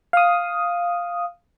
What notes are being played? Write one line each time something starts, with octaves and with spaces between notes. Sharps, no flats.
F5 D#6